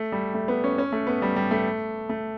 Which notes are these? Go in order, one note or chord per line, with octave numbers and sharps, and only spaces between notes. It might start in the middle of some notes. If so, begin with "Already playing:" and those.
Already playing: A3
G3
A3
B3
C#4
C#4
A3
B3
G3
G3
A3
A3